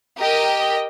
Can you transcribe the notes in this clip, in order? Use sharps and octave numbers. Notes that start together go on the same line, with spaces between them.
G4 A#4 D#5 G5